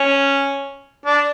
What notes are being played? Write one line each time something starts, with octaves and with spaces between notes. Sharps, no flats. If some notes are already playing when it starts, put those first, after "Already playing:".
Already playing: C#4
D4